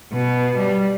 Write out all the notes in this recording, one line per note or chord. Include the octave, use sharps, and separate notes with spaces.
B2
G3